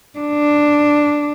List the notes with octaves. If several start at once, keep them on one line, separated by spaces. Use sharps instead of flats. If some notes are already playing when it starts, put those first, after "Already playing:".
D4